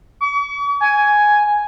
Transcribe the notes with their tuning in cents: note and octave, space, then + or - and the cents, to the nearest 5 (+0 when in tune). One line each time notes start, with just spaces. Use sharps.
C#6 +45
G#5 +5